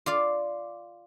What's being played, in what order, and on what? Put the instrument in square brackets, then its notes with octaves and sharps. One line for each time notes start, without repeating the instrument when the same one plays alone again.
[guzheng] F4 D5 F5